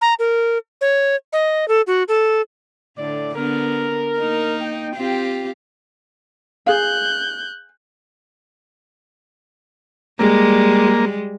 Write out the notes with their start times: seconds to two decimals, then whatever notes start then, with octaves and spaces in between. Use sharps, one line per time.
0.01 A#5
0.19 A#4
0.81 C#5
1.33 D#5
1.68 A4
1.87 F#4
2.08 A4
2.98 A2 D3 D5
3.35 D3 B3 A#4
4.18 A#3 D#4
4.61 G5
4.95 C4 F4 G4
6.67 G#4 F5 F#6 G6
10.19 G3 G#3 A#3